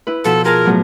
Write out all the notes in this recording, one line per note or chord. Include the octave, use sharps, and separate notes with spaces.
E4 B4
B2 F3 A4
F4 G#4 A#4 A5
A2 F#3 B3